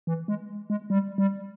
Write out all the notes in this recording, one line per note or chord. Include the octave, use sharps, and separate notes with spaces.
E3
G#3
G#3
G3
G3